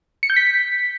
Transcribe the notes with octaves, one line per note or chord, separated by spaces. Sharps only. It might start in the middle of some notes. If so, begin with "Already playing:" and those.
C#7
G6
B6